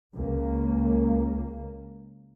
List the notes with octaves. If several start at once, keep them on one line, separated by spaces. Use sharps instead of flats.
C#2 A#3